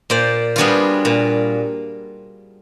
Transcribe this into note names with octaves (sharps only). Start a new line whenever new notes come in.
A#2 C5 D5
G3 B3 D4 F4 F#4 G#4
A#2